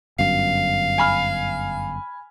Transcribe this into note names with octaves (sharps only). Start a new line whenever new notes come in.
G1 F#2 F5
G#5 B5 F6